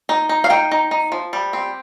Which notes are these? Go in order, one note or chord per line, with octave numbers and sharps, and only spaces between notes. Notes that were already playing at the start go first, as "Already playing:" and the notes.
D#4
D#4
F5
D#4 G5
D#4
D#4
F3
G3
C4